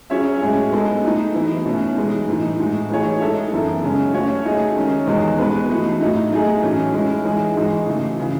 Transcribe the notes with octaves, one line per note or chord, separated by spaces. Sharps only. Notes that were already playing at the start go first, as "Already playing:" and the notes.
F#3 C#4 G#4 C#5 E5
A2 G#3 C#4 G#4
G#3 B3 D#4 A4
F#3 A3 D#4
E3 B3 E4
B2 A3 C#4
E3 G#3 D#4
A2 E3 A3 D#4
A2 G#3 D#4 F#4
E3 A3 D#4 G#4 C#5
G#3 D#4 A4 E5
F#2 E3 B3 E4 A4
C#3 G#3 C#4
A3 C#4 F#4 C#5
A3 D#4 G#4 D#5
D#3 G#3 C#4
E2 B2 G#3 D#4 F#4
G#3 B3 F#4 B4
E3 A3 D#4
A2 F#3 A3 D#4
F#3 A3 D#4 G#4
A2 E3 A3 C#4
G#3 C#4 E4
E3 G#3 D#4 G#4
G#2 E3 G#3 D#4 F#4
C#3 E3 A3
C#3 E3